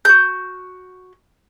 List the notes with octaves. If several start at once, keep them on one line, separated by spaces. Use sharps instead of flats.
F#4 G6